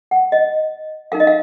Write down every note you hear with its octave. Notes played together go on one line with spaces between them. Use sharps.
F#5
D#5
D#4 A#4 F5
D#5
F5